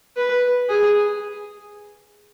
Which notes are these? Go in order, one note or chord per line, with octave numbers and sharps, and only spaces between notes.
B4
G#4